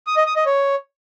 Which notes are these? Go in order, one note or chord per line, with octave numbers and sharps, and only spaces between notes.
D#6
D#5
D#6
D#5
C#5